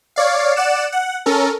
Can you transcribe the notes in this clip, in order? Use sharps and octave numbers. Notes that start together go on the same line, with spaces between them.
C#5 D5 F5
D5 F#5 E7
F#5
C#4 A4 A#4